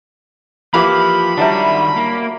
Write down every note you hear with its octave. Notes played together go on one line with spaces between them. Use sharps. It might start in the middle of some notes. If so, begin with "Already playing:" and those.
E3 F3 A#3 F4 G4 F5 B5 D6
D#3 F#3 G3 D4 E5 A5 A#5
A#3